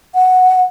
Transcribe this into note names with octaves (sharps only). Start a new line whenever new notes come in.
F#5